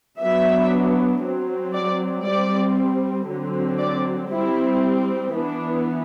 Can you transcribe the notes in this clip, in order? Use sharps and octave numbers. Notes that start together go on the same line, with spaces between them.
F#3 B3 D4 E5
F#3 C4
D5
G3 C4 D5
D3 F#3 C4
D5
G3 C4 E4
E3 B3 D4